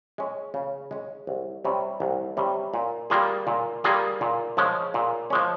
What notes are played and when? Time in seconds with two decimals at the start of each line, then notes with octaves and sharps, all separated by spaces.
0.18 G#3 C#4
0.54 C#3
0.91 G#3 C#4
1.27 C2
1.65 C3 G3 C#4
2.00 C2
2.37 C3 G3 C#4
2.74 A#2
3.10 G3 A#3 F4 G#4
3.47 A#2
3.84 G3 A#3 F4 G#4
4.21 A#2
4.57 F3 G#3 C#4
4.94 A#2
5.30 F3 G#3 C#4